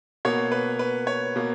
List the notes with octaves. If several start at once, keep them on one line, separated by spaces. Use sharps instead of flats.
B2 A#3 C#5
B4
B4
C#5
B2 A#3